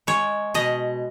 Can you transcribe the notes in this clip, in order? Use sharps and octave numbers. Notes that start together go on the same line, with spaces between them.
G#3 C#5
B2 D#5